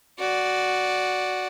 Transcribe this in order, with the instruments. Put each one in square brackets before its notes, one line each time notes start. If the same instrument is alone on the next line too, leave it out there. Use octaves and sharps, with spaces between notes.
[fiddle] F#4 D5